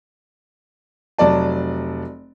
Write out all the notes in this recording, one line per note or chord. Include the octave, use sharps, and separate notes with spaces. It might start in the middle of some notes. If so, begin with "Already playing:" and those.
F1 F#3 D5 A5